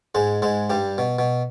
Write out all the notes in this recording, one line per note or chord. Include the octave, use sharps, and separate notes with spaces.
G#2 G#3
G#2 G#3
G2 G3
B2
B2